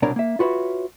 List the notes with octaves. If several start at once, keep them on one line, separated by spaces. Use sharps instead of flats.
C2 B2 D4 A#4 C#5
A#3 E5
F4 F#4 B4 C#5 E5